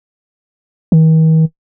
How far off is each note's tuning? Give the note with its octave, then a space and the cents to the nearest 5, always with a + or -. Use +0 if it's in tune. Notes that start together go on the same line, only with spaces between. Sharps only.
D#3 +45